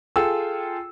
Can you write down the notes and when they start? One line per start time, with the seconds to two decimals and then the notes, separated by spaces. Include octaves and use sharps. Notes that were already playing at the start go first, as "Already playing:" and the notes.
0.16 F4 G#4 A4 G5 E6